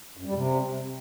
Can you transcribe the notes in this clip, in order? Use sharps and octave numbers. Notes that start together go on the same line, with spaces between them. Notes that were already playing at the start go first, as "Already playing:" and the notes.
F#2
G3
C3